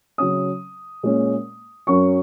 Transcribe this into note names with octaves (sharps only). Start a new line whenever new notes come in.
C#3 F#3 C#4 D#6
A#2 G#3 C#4
F#2 F#3 C#4 C#6